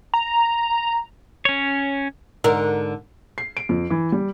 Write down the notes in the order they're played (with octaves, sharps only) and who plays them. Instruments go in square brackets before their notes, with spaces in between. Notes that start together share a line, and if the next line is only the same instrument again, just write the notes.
[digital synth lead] A#5
[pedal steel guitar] C#4 C#5
[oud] G#2 D3 A#4
[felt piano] C7
D7
F2
E3
G3